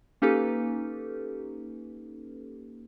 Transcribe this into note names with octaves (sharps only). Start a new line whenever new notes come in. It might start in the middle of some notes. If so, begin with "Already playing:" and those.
A#3 C#4 D#4 G4 A4 B4